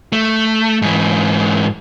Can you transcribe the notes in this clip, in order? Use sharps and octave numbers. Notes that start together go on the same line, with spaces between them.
A3
G#2 E3